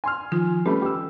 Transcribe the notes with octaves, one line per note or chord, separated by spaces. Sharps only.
G#5 C6 F6
D#3 F3 F4
G3 A3 C#4 A4 B4 B5
G4 E6